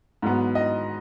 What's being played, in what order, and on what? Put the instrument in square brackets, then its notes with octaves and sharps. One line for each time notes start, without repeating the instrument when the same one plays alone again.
[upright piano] G#2 F#3 B3
D#5